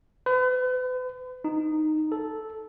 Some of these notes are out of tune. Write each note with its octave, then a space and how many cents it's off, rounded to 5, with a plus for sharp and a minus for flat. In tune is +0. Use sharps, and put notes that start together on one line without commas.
B4 +40
D#4 -10
A4 -5